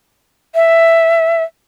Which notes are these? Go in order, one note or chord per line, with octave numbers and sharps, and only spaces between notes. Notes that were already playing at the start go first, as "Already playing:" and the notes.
E5